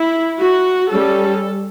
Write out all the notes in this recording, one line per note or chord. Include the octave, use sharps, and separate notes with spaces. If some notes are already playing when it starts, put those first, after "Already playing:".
Already playing: E4
F#4
G3 C#4 A4